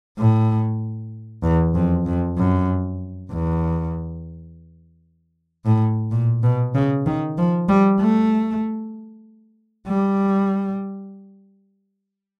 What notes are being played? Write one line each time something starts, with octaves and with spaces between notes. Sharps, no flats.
A2
E2
F2
F2
F#2
E2
A2
A#2
B2
C#3
D#3
F3
G3
A3
G3